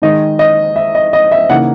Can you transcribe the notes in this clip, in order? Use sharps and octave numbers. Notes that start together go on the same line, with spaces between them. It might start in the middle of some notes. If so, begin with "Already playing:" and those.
D#3 G#3 D#4 D#5
D#5
E5
D#5
D#5
E5
C#3 E3 A#3 D#4 F#5